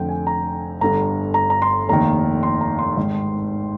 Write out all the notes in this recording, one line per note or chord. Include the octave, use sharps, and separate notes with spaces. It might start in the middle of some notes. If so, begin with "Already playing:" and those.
Already playing: F1 F2 D3 G5
G#5
A#5
G1 G2 D3 A#5
A#5
A#5
C6
F1 D#2 D#3 A#5
C6
A#5
C6
G#1 G#2 D#3